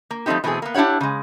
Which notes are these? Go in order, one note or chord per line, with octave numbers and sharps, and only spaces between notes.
A#3
F3 G3 A3 C4 D#4 G4
B2 E3 G3 A3 C4 G#4
A#3 B3
D4 E4 G4 C#5 F#5
C#3 G#3